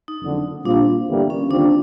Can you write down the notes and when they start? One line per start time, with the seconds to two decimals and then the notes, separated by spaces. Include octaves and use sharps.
0.08 D#4
0.22 F#1 F2 D3
0.65 A#2 G3 C4 D4 F4
1.08 G1 G2 E3 G3 A#3
1.30 C#4
1.50 D#2 D3 G3 C4 D4 F4